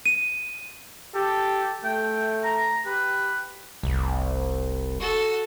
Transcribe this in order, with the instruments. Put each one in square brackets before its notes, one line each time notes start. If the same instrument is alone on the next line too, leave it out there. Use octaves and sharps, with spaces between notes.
[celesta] D#7
[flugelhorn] G4 [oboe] A4
[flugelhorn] A3 [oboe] G5
[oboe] A#5
[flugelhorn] G4 [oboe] B4
[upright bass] F1 [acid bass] C2
[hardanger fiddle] F#4 A4